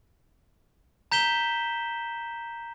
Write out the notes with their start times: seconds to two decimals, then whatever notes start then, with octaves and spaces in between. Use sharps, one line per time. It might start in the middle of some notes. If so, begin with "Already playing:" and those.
1.12 A#5 G6 B6 E7 G7